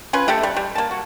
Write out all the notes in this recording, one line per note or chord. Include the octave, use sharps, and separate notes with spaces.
C#4 F4 B4 G#5
A3 G4 A4 E5
G3
G3
A#3 A5
F#4